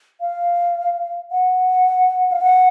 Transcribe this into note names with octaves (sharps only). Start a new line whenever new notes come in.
F5
F#5
F5
F#5